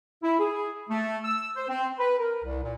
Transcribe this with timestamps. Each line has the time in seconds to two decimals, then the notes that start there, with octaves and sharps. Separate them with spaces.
0.23 E4
0.39 G#4
0.90 A3
1.24 E6
1.56 C5
1.69 C4
1.99 B4
2.18 A#4
2.44 C2
2.63 A#2